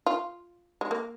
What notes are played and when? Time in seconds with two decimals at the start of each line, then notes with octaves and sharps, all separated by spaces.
0.06 F4
0.81 G#3
0.91 A#3